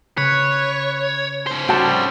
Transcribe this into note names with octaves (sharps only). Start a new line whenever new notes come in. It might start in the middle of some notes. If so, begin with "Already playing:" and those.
C#3 B4 C#5
C#4 C5
G3 C4 F#4 A5